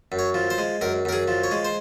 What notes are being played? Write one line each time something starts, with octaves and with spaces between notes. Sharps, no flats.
F#2
C#5
F3
C5
G#3
F#2 A#4
F#2 A#4
G#4
F3
C#5
G#3
C5